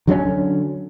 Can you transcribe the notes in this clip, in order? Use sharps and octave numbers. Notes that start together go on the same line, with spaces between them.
D3 F#3 G3 C#4